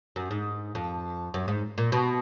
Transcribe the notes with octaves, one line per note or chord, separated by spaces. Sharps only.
F#2
G#2
F2
F#2
G#2
A#2
B2